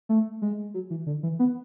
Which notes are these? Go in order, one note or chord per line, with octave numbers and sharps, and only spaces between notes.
A3
G#3
F#3
E3
D3
E3
B3